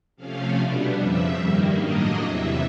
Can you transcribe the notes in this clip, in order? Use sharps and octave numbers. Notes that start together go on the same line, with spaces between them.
C3 F3 A3 C#4 F5
B2 G3 B3 D4
F2 C#3 F3 E5
G2 D#3 G3 A#3
A2 F#3 A#3 D4 D#5
E2 C3 E3 E5